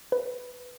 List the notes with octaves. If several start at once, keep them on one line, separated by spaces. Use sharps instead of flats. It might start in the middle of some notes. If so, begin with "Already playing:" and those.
B4